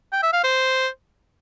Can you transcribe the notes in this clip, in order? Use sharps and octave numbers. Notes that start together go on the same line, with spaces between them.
G5
E5
F5
C5